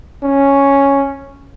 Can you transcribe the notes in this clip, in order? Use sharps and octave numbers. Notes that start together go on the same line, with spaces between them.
C#4